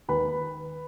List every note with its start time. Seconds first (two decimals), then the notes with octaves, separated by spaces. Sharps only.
0.09 D#2 B4 B5